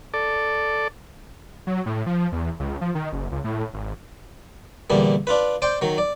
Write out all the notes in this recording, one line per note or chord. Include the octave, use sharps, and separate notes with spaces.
A4 D5
F#3
A2
F3
E2
C#2
F3
D#3
F#1
C#2
A2
G#1
E2 A#2 D3 G3
D4 F4 B4
C5 D5 G5
D#3 F#3
D5